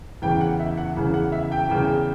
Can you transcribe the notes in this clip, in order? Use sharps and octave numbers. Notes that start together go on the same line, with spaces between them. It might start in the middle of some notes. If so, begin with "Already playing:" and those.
E2 C#3 E3 G5
F#5
E5
F#5
E2 C#3 E3
F#5
E5
G5
E2 C#3 E3 G5